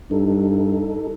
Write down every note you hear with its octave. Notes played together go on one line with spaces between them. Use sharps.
G2 D#4 A4